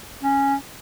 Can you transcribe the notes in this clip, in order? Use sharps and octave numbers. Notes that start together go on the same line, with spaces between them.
C#4